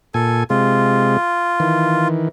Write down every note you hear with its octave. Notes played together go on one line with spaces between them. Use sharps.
A#2 A4 G#5
C3 G#3 F4
D#3 E3